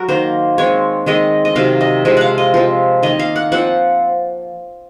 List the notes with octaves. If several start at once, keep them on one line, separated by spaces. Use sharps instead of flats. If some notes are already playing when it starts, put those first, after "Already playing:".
Already playing: F#3 F#4 A#4
D#3 A#3 C5
D#3 G#3 C4 C#5
D#3 G#3 C4 D#5
D#5
C3 D#3 F#3 F5
D#5
C3 F3 G#3 C4
F5 F#5
D#5
F3 C4
D#3 A#3 D#5
F5
F#5
F3 C4 F#5